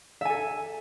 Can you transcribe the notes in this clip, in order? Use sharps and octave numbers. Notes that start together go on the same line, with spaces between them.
A4 E5 G#5